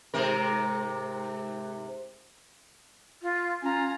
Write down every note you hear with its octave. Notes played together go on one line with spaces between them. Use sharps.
G#2 C3 A#4
F4
C#4 F4 G#5 A#5